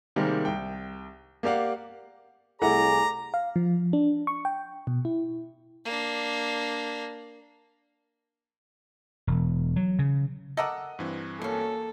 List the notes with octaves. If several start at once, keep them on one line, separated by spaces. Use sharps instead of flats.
C3 D#3 G3 G#3 A#3 C4
C2 G5
A#3 G4 D5 F5 F#5
C2 A3 E4 G#4 D5 F#5 A#5
F5
F3
D4
C#6
G5
B2
E4
A#3 D4
E1
F#3
C#3
A4 A#4 D#5 F#5 D6 E6 A#6
G2 E3 C4
B2 A#3 C#4 A4